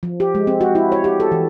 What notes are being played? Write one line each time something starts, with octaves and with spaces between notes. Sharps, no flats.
F3
G4
G#3
C4
F#4
E4
C#5
G4
A4
E3